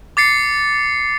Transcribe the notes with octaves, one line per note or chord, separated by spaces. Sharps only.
D6 A6 C7 C#7